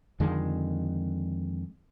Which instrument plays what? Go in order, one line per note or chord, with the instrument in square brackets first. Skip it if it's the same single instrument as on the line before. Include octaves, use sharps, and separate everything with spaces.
[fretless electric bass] F2 D3 D#3 G#3